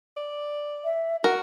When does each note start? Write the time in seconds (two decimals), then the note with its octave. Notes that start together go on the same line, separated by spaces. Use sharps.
0.17 D5
0.85 E5
1.24 F#4 A#4 F#5